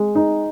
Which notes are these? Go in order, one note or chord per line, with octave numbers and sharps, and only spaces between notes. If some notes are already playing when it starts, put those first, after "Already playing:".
Already playing: G#3
D#4